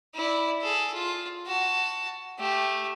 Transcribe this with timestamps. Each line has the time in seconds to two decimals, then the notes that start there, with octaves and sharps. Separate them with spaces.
0.15 E4 D5
0.62 G#4 A4
0.94 F4
1.46 F#4 A5
2.38 A3 G4